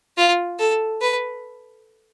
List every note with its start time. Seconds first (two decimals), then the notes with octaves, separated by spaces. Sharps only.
0.17 F4
0.59 A4
1.01 B4